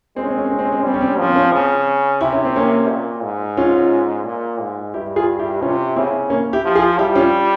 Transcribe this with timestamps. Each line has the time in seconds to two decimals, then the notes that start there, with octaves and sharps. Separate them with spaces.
0.16 G#3 C4
0.24 C#4
0.30 C4
0.37 C#4
0.44 C4
0.51 C#4
0.59 C4
0.65 C#4
0.72 C4
0.80 C#4
0.84 G3 C4
0.94 C#4
1.01 C4
1.08 C#4
1.15 C4
1.19 F3 C#4
1.29 C4
1.36 C#4
1.43 C4
1.52 C#3
2.21 C3 E4
2.33 C#4
2.45 C4
2.56 A#3 C#4
2.89 A#2
3.23 G#2
3.57 C#4 F4
4.26 A#2
4.60 G#2
4.94 G2 E4 G4
5.16 F4 G#4
5.39 E4 G4
5.62 C3 C#4 F4
5.96 C#3 C4 E4
6.30 A#3 C#4
6.53 E4 G4
6.65 F3
6.75 F4 G#4
6.98 G3 E4 G4
7.16 C#4 F4